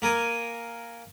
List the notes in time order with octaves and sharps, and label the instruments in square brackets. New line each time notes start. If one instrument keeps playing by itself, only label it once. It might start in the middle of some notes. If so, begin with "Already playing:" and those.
[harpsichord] A#3 A#4 G#5 D#6